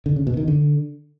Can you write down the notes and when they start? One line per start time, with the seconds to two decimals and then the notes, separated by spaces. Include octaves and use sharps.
0.06 D3
0.16 C#3
0.27 B2
0.37 D#3
0.48 D3